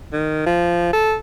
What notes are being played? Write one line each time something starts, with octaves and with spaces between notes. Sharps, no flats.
D#3
F3
A4